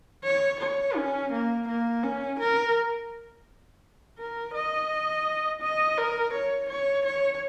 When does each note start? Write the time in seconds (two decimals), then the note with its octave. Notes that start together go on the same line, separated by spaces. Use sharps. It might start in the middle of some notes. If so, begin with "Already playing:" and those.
0.24 C#5
0.61 C#5
0.96 C#4
1.32 A#3
1.68 A#3
2.04 C#4
2.39 A#4
4.18 A#4
4.54 D#5
5.62 D#5
5.98 A#4
6.34 C#5
6.69 C#5
7.05 C#5